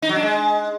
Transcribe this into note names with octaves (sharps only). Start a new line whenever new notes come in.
D#4
F#3
D4
G#3